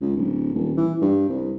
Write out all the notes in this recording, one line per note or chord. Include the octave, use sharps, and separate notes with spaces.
C#2
D1
D#1
E3
G2
C2